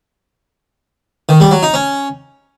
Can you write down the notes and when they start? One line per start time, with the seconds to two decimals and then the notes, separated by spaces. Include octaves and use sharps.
1.29 D#3
1.40 G3
1.51 F#3
1.63 D#4
1.74 C#4